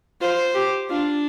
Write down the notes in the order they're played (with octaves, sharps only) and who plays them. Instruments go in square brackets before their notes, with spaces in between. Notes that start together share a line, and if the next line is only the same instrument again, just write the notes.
[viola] F4 [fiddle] C5
[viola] G4
[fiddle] D4 [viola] F4